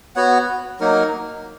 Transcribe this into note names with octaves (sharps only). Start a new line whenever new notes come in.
B3 F#4 C#5 F#5
F#3 A#3 D#4 A#4